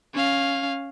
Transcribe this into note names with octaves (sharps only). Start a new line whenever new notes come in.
C#4 F5